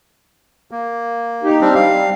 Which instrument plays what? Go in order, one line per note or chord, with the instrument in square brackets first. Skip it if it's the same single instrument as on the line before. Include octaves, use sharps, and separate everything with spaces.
[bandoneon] A#3
[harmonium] D#4 G4
[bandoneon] G3 C4 D4
[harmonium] G3 [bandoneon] F5